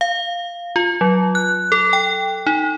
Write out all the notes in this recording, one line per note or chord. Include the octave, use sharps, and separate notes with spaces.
F5
F4
F#3
F#6
A4
G5
D#4